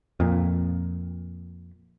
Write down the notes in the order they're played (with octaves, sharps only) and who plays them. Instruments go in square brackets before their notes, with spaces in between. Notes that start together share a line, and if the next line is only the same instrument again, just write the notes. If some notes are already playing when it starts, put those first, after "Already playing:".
[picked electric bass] F2 A#2